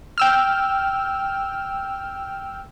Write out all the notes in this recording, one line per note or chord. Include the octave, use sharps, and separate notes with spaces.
G5 E6 F6